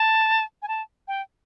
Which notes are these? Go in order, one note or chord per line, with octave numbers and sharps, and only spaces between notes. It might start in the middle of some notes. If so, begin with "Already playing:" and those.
Already playing: A5
G#5
A5
G5